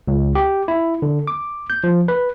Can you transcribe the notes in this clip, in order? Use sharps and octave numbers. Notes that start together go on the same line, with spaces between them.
C#2
G4
E4
D3
D6
G6
F3
B4